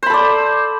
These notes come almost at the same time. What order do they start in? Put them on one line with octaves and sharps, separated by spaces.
C5 B5 A4 D5